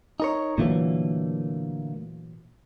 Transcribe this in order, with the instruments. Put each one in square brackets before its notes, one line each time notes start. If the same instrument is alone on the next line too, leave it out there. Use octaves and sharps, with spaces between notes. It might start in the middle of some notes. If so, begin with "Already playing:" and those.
[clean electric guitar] D#4 A#4 C#5
[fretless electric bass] A#2 E3 F#3 [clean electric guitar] D3 A3 A#3